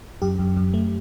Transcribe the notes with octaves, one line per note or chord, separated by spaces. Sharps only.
F#2 G4
F#2
F#2
A3